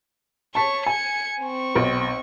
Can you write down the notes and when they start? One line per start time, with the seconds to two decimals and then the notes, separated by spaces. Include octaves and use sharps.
0.55 C#5 A5 C#6 B6
0.86 G#5 G#6 C#7
1.42 C4 C#6
1.75 B1